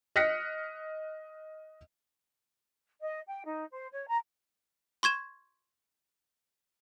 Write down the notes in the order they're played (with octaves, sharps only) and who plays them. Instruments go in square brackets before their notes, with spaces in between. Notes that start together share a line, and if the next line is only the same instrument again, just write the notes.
[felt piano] D#5 F6 F#6 A#6 B6 C#7
[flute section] D#5
G5
D#4
C5
C#5
A#5
[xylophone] C6 C#6 G#6 E7